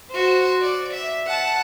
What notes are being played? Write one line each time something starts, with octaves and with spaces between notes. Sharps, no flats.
F#4 C5
D5
E5
F#5 A5